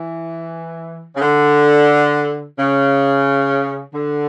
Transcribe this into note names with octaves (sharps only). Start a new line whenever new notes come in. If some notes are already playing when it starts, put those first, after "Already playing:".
Already playing: E3
C#3
D3
C#3
D3